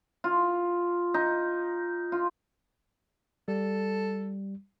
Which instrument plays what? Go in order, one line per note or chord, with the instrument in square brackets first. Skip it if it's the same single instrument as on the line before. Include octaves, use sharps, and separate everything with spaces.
[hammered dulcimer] F4
D#4
F4
[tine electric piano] G3 [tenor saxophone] A4